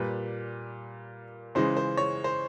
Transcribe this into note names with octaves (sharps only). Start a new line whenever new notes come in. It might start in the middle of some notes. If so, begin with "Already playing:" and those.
Already playing: A#2 G3 B4
C#3 E3 G#3 C5
C5
C#5
C5